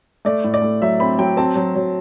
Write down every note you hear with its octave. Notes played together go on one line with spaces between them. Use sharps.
A3 D5
A2
D5
A3
F#3 E5
C4 B5
F#3 G5
C4 A5
F#3
F#3